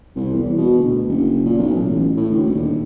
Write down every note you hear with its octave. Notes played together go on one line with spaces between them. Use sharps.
C2
E2
B2
D2
F#1
A#2
B1
A1
A2
D2
D#1